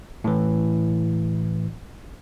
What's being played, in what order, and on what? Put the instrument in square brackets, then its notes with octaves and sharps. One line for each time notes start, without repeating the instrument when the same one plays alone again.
[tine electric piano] A2 E3